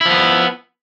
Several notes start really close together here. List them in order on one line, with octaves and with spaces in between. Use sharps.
E4 F3 B3